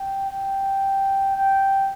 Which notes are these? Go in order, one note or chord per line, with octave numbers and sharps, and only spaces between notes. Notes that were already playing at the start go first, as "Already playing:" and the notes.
Already playing: G5
G5
G5